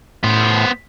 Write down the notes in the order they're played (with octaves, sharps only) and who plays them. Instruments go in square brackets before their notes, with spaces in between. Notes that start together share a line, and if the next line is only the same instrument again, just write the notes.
[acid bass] A2 [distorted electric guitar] B3 C5